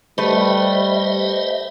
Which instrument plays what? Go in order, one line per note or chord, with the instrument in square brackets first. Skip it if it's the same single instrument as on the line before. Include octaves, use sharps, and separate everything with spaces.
[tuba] G3 [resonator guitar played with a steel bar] A3 B4 [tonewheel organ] C5 D#5 E5